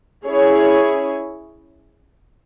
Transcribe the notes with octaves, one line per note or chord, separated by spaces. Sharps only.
C#4 E4 G#4 C#5